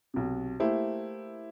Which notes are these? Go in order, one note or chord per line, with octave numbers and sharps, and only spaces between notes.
B1 C3
A3 A#3 E4 G4 C5